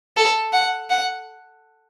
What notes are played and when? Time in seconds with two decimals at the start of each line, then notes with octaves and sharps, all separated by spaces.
0.17 A4
0.53 F#5
0.90 F#5